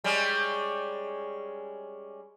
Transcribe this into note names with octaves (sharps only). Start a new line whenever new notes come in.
G3 G#3 C#4